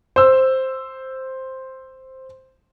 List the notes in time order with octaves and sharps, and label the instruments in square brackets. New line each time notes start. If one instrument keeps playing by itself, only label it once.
[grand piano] C5 E6